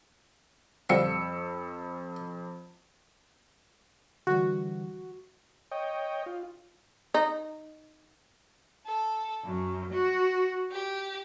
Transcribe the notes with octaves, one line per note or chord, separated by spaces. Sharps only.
F2 D3 F3 G3 E6 C#7
D3 E3 G3 F#4
C#5 D#5 G5
F4
D#4
A4
F#2
F#4
G4